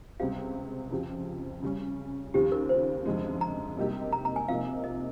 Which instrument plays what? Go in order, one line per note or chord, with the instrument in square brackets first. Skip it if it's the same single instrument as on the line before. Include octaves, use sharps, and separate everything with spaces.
[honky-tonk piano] C#2 C3 G3 C4 G4 [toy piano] F5
[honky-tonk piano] F2 C#3 F3 C4 G4
C#3 G3 C#4
[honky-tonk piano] D#2 C#3 F3 C4 [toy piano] G4
[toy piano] A#4
C5
[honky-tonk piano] G1 F2 C#3 G#3
[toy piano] A#5
[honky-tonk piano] C3 G3 A#3 D#4 G4
[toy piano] A#5
A#5
G#5
[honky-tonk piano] C3 F3 A#3 D#4 [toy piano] F5
[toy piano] D#5